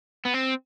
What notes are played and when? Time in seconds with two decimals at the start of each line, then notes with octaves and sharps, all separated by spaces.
0.25 B3
0.34 C4